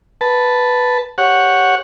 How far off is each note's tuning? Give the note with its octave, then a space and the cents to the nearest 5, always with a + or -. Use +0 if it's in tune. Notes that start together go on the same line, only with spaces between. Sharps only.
B4 +0 A5 +0
G4 +0 C#5 +0 F#5 -10